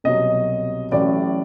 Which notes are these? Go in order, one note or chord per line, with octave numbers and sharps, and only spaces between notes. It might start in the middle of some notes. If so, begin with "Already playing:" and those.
C2 B2 F#3 D#5
A1 A2 F#3 D5